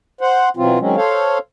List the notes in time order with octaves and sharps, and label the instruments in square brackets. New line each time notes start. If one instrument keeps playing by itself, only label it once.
[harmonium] C5 F#5
B2 E3 F#3 C4 F4
D#3 F#3 G#3 C4 C#4
A4 C5 C#5 F5